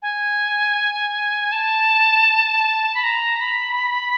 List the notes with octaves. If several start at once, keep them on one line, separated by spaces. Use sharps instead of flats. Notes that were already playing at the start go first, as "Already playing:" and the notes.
G#5
A5
B5
A#5
B5